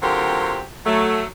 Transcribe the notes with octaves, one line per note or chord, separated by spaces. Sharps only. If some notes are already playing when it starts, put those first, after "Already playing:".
D3 F#3 C4 F4 G4 A#4
F#3 A3